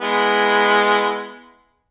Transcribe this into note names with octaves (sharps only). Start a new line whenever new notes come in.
G#3 B3 E4